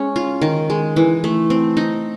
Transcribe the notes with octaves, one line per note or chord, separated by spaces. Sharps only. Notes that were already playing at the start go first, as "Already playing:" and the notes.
Already playing: G#3 C#4
F4
D#3
G#3
E3
A3
C4
D#4